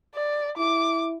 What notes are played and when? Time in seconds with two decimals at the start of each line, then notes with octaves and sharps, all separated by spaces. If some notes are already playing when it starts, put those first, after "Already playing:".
0.15 D5
0.57 E4 D6